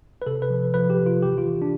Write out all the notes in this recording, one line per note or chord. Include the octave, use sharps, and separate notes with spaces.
B4
C3 A4
B4
F3
F3 B4
G4
C3
F4
E3 G4
F4
E3
D4